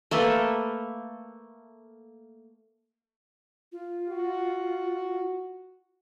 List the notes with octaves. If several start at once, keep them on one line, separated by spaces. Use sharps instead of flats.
A3 A#3 A4 B4
F4
F#4